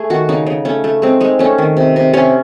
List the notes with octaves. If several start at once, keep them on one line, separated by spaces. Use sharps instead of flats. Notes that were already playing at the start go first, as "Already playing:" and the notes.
Already playing: A3 C#4 G#4
D#3 F#4
C#3 D#4
C#3
A3 C#4
A3
G#3 C4
G#3 D#4
A3 C#4
D#3
C3
C3
C3 C#4